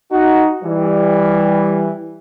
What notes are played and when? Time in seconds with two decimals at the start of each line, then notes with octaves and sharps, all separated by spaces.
0.12 D#4 F#4
0.64 E3 G3